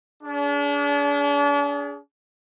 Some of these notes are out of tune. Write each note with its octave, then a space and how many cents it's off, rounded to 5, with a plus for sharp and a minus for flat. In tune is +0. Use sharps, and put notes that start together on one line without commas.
D4 -40 G#4 +0